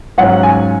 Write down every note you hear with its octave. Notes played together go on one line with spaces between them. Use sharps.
G#2 F#3 C#4 F4 F#5
G#5